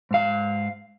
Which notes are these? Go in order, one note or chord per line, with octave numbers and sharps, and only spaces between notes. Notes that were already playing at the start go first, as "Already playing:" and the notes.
G#2 F5